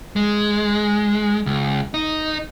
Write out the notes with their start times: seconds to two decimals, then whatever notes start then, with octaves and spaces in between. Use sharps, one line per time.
0.16 G#3
1.46 C#2
1.94 D#4